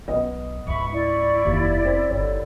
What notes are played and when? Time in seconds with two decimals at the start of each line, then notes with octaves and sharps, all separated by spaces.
0.08 B1 B3 D#5
0.67 C#2 G#2 E5 B5 C#6
0.92 E4 D5
1.45 F1 D#2
1.85 C4
2.10 G1 D#2 D3 C#5